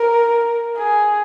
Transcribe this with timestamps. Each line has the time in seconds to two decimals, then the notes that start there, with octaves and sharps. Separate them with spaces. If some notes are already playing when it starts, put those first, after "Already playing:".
Already playing: A#4
0.77 G#4